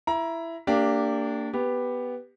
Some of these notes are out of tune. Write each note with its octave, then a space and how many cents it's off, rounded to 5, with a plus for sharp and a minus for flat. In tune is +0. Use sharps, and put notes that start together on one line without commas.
E4 +10 A#5 +25
A#3 -30 D4 -10 G4 +0
B3 +0 G4 +10